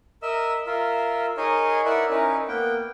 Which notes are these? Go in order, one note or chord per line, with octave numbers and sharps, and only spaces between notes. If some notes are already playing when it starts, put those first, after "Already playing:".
A#4 D#5 E5 E6
F4 A#4 E5
D#4 G#4 A#4 C#5 D#5
E4 A#4 B4 D5 E5 F#5
C#4 D#4 E4 A#4 B4
A#3 B3 G5